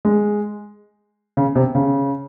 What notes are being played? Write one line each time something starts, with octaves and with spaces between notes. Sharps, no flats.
G#3
C#3
C3
C#3